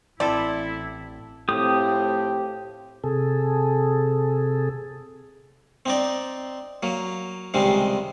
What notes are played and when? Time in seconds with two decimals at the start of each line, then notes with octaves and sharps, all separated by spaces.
0.20 A1 C4 E4 A4 D5
1.49 A2 F3 C4 G4 D#6
3.04 C3 G#4 A4
5.86 C4 D#4 D5
6.83 F#3 A#3
7.54 C#2 C3 D#3 G3 G#3 C4